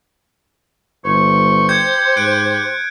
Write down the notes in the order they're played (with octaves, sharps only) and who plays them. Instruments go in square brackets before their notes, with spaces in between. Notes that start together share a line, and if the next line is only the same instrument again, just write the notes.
[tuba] G1 [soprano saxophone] C5 [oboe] C#6
[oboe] G4 [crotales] G6 G#6 C#7
[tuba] G#2 [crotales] F#6 D7